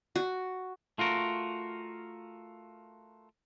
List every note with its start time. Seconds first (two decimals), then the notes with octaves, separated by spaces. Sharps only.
0.16 F#4
0.98 A3 F4 F#4 A#4